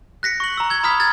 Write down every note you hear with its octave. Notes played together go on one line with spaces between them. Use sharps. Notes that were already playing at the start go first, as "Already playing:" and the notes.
F#6 A#6 B6 C#7
C#6 F#7
A#5 E6
G#6 G7
A#5 B5 D#6 F6 G#6 B6
F6 G#6 A6